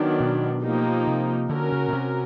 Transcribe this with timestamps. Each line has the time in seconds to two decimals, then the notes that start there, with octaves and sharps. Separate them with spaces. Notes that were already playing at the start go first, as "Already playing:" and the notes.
Already playing: D#3 F#3 B3 D4
0.20 B2
0.63 F3 A#3 D#4 G4
1.07 C3
1.50 D3 C#4 F#4 A#4
1.72 C#3
1.88 B2
1.93 C3